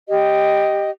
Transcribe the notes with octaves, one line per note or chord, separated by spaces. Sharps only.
G4 D#5